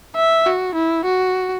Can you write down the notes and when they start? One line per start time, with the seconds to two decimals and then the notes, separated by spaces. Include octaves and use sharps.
0.16 E5
0.46 F#4
0.75 E4
1.05 F#4